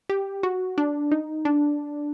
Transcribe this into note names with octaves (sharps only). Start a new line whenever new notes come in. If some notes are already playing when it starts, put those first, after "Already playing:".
G4
F#4
D4
D#4
D4